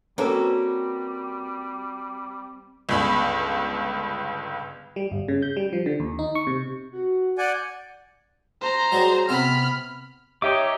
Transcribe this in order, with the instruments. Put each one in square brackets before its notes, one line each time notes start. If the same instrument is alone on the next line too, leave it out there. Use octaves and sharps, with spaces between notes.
[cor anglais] G3 [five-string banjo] A#3 C#4 A4 [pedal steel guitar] C4 E6 [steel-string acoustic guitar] F#4 B4
[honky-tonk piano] G1 C#2 B5
[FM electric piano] G3
G1
C#3
G6
G3
F3
D3
D#2
D#4
C#6
C3
[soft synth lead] F#4
[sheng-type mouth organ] D5 F#5 G#5 [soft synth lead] G6
[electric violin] C5 A#5
[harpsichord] F#3 G3 G#4
[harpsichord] C3 B3 C4 [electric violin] B5 F6
[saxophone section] D#4 G4 [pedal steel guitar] C#5 E5 D6